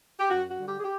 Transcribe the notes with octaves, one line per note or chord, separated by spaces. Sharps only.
G4
F#2 F#4
F#4
D3 G3
G4
G#4
G4